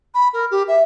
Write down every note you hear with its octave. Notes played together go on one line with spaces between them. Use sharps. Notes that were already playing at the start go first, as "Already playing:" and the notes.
B5
A#4
G4
E5